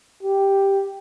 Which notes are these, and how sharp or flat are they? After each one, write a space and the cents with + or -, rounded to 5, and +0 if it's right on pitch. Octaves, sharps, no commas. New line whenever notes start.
G4 +0